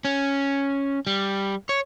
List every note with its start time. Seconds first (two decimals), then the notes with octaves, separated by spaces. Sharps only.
0.05 C#4
1.07 G3
1.69 C#5